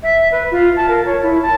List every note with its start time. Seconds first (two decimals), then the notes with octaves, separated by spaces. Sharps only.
0.02 E5
0.31 B4
0.51 F4
0.76 A5
0.88 A#4
1.05 C#5
1.22 E4
1.41 A5